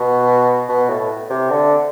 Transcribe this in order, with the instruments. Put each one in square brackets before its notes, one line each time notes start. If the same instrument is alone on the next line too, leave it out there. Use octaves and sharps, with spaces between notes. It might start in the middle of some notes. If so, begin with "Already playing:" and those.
Already playing: [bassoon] B2
B2
A2
C3
D3